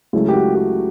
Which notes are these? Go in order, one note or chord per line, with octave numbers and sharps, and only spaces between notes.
C#2 C#3 F#3 A3 E4
G4
F#4
G4